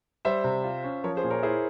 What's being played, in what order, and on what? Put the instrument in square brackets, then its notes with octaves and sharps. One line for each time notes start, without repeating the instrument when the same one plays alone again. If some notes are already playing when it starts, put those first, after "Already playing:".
[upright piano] G3 [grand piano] C5 E5
[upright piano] C3
F4
C#4
[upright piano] F3 [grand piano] A#4 C#5
[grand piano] G#4 C5
[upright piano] A#2
[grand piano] A#4 C#5
[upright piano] E4 [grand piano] G#4 C5